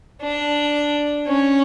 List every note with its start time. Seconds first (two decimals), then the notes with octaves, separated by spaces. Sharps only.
0.22 D4
1.27 C#4